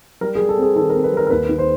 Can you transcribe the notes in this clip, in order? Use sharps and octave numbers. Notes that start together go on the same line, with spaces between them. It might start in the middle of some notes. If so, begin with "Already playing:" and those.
G3 A#4
G#4
G3
A4
C4 G#4
D#3 A4
A#4
C4
B4
G3 A#4
A#4
D#2 B4
D#3
C5